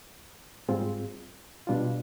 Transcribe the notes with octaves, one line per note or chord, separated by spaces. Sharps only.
G#2 G3 C4 F4 G#4
B2 G3 D4 F4